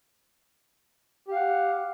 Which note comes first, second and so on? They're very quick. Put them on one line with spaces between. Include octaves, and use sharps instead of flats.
G4 F5 F#5